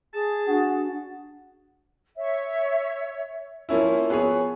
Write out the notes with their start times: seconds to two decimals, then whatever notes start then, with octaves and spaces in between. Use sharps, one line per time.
0.14 G#4 A5
0.47 D4 F#4
2.17 C#5 E5
3.69 F3 A#3 C#4 E4
4.10 B3 G#4 C#5